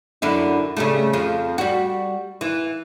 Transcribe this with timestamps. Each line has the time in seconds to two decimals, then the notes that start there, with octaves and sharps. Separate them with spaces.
0.22 F#2 D3 E4
0.77 C#3 G3 A3
1.13 F2 F3
1.58 G3 F#4
2.41 E3